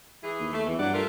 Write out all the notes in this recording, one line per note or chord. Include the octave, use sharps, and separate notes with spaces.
E3 E4 G#4
D#2
A3
E2 E3
G2 F#3 D5 F#5
A3 F4 A#4